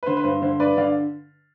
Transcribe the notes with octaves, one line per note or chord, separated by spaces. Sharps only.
B4
D3 C5
B4
G2 C5
D3 C5
G2 B4 D5
D3 D5 F5